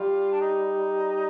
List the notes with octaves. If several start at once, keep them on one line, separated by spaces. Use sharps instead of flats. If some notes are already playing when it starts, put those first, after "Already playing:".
Already playing: G3 F4
D4
D#4